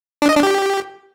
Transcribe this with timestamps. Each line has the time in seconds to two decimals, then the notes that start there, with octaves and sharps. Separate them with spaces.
0.22 D4
0.29 D#5
0.36 D4
0.43 G4